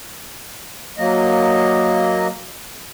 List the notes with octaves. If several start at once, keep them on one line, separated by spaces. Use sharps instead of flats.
F#3 A#3 D#5